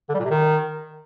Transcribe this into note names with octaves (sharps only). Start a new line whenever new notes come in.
D3
G3
A#2
C3
D#3